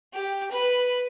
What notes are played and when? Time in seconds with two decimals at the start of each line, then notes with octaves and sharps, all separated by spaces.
0.14 G4
0.51 B4